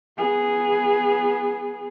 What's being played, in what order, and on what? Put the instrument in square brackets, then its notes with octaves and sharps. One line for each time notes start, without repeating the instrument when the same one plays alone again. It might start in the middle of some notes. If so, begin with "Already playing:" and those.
[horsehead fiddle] B3 G#4